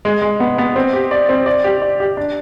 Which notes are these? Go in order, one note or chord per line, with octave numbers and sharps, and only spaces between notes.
G#3
G#3
B3
B3
C4
G4
D5
C4
D5
G4
D5
G4
D4